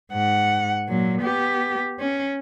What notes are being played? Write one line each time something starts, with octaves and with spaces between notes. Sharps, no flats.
G#2 F#5
A#2 F#3
B3 G4
C#4